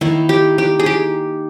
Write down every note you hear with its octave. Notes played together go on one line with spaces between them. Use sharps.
D#3 A#3 D#4 E4
G4
G4
G#4
G4